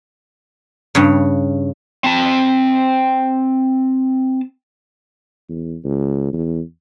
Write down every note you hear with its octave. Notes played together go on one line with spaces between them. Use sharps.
G2 C#3
C4 A5
E2
C#2
E2